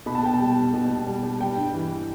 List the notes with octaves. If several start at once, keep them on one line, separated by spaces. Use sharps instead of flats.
B2 B5
A5
B2 G5
A5
G3
G3
B2
B2
G3
G3
G3 G5
G2
E3